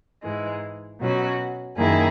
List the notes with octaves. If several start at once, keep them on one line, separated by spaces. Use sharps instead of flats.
G#2 E3 G#3
B2 F#3 C#4 F#4
F#2 D#3 A#3 E4 G#4